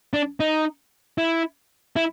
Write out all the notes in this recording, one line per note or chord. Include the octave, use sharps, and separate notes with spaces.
D4
D#4
E4
E4